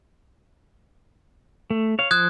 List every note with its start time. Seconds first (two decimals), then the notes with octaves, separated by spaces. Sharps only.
1.70 A3
1.99 C#5 F5
2.11 F3 C5 D#6 F#6 G#6